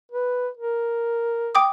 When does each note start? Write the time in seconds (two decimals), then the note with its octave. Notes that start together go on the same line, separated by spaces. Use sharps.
0.12 B4
0.57 A#4
1.55 G5 D6 D#6